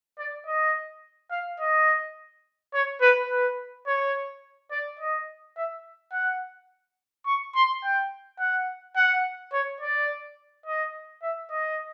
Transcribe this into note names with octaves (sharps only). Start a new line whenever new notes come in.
D5
D#5
F5
D#5
C#5
B4
B4
C#5
D5
D#5
E5
F#5
C#6
C6
G5
F#5
F#5
C#5
D5
D#5
E5
D#5